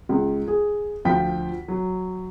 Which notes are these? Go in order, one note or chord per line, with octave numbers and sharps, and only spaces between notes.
C#2
G#4
D2 F3 F4 G5 B6
F#3